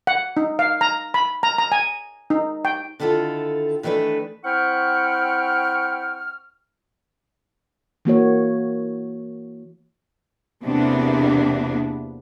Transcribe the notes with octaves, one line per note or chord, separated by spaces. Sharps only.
F#5
D#4
F5
A#5
B5
A#5
A#5
G#5
D#4
G5
D3 D#3 E4 F4 A4
D#3 E3 A3 D4 B4
C4 E4 F#5 G5 C#6 F6
E3 A#3 F#4 C#5
E2 C3 A#3 B3 D4